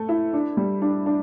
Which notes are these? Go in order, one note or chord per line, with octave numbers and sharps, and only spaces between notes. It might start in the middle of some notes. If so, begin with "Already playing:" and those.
Already playing: A3 A4
E4
D4
G3
D4
D4